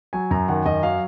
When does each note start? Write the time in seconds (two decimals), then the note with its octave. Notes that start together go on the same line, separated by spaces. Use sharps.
0.13 F#3 G#5
0.31 F#2 A#5
0.48 D#3 F#5
0.65 F#2 D#5
0.83 F#3 F5